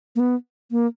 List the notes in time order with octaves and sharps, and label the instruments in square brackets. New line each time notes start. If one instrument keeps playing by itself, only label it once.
[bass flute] A#3
B3
A#3